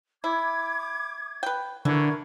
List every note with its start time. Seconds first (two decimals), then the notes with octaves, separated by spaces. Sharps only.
0.24 E4 D6 G#6
1.43 B4 G5
1.85 D3 E3 A#4 C#6 G#6